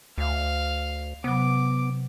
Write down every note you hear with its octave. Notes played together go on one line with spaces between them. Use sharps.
D2 F5
C3 F#3 B3 D6